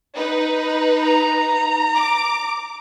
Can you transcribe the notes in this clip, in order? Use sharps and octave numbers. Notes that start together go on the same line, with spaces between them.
D#4 B4
A#5
D6